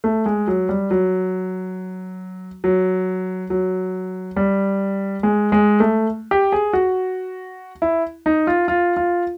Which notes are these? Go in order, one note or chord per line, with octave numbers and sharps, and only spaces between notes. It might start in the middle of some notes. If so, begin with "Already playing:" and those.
A3
G#3
F#3
G3
F#3
F#3
F#3
G3
G#3
G#3
A3
G4
G#4
F#4
E4
D#4
F4
F4
F4